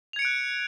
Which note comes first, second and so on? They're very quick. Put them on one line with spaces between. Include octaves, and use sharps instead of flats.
F7 G#6 C#7 D7 F#6